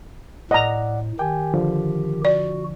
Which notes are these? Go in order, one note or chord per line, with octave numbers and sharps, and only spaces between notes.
A2 D5 D#5 F#5 A#5
D#3 G4 G5 G#5
D3 F3
F#4 D5